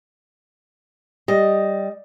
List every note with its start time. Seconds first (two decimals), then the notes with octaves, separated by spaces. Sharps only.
1.28 G3 D#5